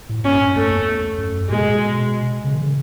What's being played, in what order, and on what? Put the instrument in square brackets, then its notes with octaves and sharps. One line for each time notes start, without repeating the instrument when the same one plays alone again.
[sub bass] A2
[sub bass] G#2 [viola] C#4
[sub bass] F#2
[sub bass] F#2 [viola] A3
[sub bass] E2
F#2
[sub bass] A2 [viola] G#3
[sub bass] B2
B2
C#3
D#3
C#3